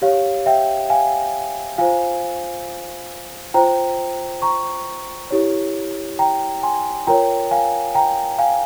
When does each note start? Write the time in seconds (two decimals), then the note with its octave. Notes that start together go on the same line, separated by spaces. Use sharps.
0.02 G4 C#5 F5
0.46 E5 G5
0.90 F5 G#5
1.78 F4 C5 F5 G#5
3.54 F4 C5 G5 A#5
4.42 A#5 C#6
5.30 E4 G4 C#5
6.19 G5 A#5
6.63 G#5 C6
7.07 F4 A#4 C#5 G5 A#5
7.51 F5 G#5
7.95 G5 A#5
8.39 F5 G#5